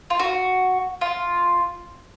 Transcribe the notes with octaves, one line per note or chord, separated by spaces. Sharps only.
F4
F#4
F4